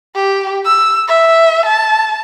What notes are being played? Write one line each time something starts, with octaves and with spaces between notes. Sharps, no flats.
G4
E6
E5
A5